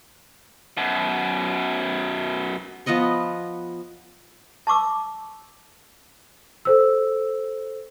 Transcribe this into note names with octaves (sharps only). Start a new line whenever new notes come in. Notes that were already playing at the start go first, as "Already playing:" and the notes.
F#2 B2
F3 B3 D#5 C#6
A5 C#6 D6 E6
A4 C5 E6